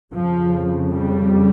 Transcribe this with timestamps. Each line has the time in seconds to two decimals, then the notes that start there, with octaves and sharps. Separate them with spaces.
0.12 F2 C#3 F3
0.91 G3